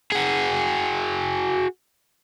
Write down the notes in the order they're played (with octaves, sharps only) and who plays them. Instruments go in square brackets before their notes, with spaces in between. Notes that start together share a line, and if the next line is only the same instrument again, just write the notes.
[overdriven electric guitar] F#4 G#4